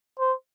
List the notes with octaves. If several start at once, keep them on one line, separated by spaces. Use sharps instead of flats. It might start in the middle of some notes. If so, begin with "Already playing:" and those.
C5